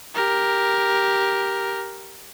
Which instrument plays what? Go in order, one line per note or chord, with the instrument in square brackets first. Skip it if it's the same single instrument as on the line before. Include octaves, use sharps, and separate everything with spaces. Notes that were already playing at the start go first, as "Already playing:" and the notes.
[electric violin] G4 A#4